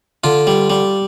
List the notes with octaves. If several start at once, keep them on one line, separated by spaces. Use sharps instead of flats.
D3 F4
G3
G3